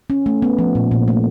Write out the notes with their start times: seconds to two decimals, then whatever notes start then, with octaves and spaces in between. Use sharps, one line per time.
0.10 C#4
0.26 A3
0.42 B3
0.59 F3
0.75 A#2
0.91 A#2
1.08 A3